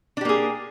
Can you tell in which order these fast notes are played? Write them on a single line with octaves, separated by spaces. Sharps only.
D4 G4 A#3 G#4